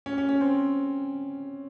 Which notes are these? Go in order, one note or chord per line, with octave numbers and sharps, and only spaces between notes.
C#4
C#4
C#4
C4